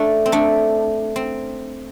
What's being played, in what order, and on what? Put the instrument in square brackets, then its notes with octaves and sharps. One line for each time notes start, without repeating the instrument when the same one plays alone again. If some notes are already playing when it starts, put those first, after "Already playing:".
Already playing: [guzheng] A3 D4
C4
A3 D4
C4